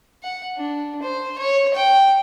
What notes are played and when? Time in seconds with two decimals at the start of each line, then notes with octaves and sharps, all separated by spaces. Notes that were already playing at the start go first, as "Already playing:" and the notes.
0.23 F#5
0.56 D4
1.02 C5
1.38 C#5
1.74 G5